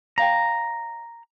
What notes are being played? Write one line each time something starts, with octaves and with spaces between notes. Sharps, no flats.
D5 F5 G5 A#5